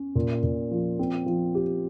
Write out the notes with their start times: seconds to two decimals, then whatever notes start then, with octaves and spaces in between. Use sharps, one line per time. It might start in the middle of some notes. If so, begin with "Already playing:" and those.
Already playing: C#4
0.15 A#2
0.43 A#2
0.71 F3
0.99 C4
1.26 F3
1.55 G4